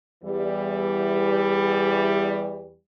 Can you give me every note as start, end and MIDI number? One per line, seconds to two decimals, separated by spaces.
0.24 2.76 40
0.24 2.76 52
0.24 2.76 55